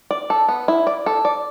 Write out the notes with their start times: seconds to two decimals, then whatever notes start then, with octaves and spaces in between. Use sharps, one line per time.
0.11 D5
0.30 A4
0.48 B3
0.68 E4
0.87 D5
1.06 A4
1.25 D5